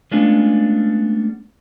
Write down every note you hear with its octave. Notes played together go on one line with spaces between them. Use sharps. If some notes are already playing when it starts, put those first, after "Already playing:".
G#3 A3 B3 C#4 D4 F4